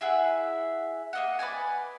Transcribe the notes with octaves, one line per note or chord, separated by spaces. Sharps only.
E4 G#4 E5 F#5
A#3 D#5 F#5
B4 D5 F#5 G#5